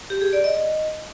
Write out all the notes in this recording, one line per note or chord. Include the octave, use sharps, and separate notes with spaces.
G4
G#4
D5
D#5